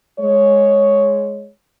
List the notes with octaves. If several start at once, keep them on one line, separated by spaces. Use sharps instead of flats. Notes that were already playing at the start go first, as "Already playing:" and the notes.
G#3 C#5